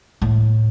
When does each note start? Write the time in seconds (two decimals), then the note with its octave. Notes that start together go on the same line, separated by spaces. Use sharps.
0.22 A2